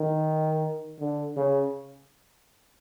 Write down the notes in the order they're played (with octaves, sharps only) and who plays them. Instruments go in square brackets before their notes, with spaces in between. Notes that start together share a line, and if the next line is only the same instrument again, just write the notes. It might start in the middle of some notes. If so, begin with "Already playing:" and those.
Already playing: [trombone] D#3
D3
C#3